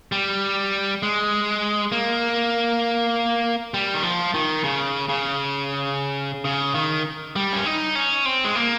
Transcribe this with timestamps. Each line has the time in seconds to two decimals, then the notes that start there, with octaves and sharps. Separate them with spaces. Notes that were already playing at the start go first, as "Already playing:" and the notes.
0.12 G3
1.03 G#3
1.92 A#3
3.74 G3
3.94 D#3
4.03 F3
4.34 D#3
4.64 C#3
5.09 C#3
6.45 C#3
6.75 D#3
7.36 G3
7.53 C#4
7.65 D#4
7.95 C#4
8.26 C4
8.44 G#3
8.55 A#3